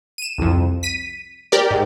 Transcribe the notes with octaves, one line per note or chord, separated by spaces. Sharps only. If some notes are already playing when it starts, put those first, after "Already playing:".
D#7 E7
C2 F2
B6 D#7
G4 A#4 D5
G#2